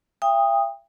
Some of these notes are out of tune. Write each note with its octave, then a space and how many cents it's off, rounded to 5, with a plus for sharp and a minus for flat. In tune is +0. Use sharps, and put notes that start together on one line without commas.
E5 +45 G5 +30 D#6 +0